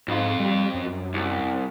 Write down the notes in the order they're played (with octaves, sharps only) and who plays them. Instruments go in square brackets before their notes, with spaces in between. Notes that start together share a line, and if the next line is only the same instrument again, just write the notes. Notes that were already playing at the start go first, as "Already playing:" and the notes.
[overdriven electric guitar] F2 F4 [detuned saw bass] G#2
[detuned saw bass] G3
F#2
[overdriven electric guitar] C2